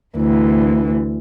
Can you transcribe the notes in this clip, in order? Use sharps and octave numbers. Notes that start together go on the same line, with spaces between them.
D2 E3